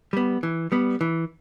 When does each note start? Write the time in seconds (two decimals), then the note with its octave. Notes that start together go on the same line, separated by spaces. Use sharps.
0.13 G3 B3
0.43 E3
0.72 G3 B3
1.01 E3